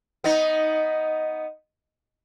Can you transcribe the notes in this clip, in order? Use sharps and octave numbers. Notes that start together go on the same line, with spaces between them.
B3 D#4